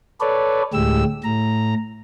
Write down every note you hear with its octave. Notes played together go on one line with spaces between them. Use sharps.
A4 B4 C#5 D5
D2 A2 G#3 G4 E6
A2 A#5